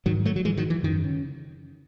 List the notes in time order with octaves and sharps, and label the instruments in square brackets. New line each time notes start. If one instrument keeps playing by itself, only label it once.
[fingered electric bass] G#2 D#3 F#3
F#3 A3
F#3
G#2 E3 G#3
D#3 F#3
E3
F#2 D#3
C#3